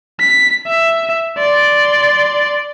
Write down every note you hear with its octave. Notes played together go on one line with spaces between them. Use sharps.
B6
E5
D5 C6